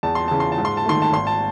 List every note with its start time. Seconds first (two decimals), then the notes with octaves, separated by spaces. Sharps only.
0.03 E2 A5
0.15 C6
0.28 C#3 E3 A5
0.40 C6
0.52 A5
0.58 G#2
0.65 C6
0.77 A5
0.86 D#3 A3 C6
1.02 A5
1.12 G#1 C6
1.27 A5